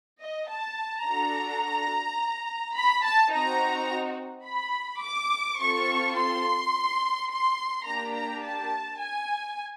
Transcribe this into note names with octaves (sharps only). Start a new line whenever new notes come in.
D#5
A5
D4 F#4 A4 A#5
B5
A5
C4 D#4 F#4 A#5
B5
D6
C4 F4 A4 C#6
C6
C6
A#3 D4 G4 A#5
A#5
A5
G#5